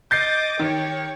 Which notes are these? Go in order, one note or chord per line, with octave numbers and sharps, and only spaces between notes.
D#5 D6 G6 A6 C7
D#3 G4 C#5